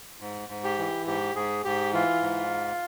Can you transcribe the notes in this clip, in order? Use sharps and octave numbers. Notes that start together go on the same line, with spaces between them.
G#2
G#2
G4
E3
G#2 G4
G#2 G#4
G#2 G4
E3 F4
G#2